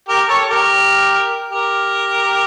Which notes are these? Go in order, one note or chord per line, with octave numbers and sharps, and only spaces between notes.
G4 A#4
A4 C#5
G4 A#4
G4 A#4